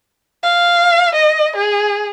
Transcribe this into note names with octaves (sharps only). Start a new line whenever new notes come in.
F5
D#5
G#4